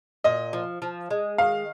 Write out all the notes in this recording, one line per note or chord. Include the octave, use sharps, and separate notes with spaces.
A#2 D#5
F3
F3
G#3
D#3 F5